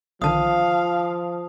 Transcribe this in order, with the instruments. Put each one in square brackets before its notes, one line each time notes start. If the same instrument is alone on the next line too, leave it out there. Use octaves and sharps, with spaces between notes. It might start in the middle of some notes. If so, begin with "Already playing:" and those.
[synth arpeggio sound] B1 D3 D#3 [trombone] F3 [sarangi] F5 [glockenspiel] A5 D#6